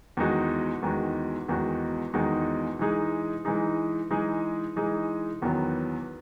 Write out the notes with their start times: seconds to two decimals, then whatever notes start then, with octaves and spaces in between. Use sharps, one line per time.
0.17 E2 D#3 G#3 D#4 F#4
0.82 E2 D#3 G#3 D#4 F#4
1.48 E2 D#3 G#3 D#4 F#4
2.13 E2 D#3 G#3 D#4 F#4
2.79 E3 G#3 D#4 G#4
3.45 E3 G#3 D#4 G#4
4.11 E3 G#3 D#4 G#4
4.76 E3 G#3 D#4 G#4
5.42 E2 D#3 F#3 B3